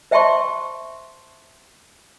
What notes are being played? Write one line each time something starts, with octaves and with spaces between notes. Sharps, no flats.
C5 E5 G5 A5 C6 C#6